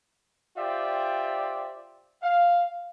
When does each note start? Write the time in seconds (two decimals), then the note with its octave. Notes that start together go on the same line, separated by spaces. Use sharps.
0.58 F4 G4 C5 D5 E5 G5
2.23 F5